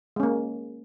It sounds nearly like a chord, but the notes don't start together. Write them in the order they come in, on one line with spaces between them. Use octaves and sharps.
G#3 C#4 A#3